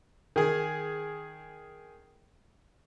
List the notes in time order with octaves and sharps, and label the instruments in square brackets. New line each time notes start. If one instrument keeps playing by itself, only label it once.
[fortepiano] D#3 G#4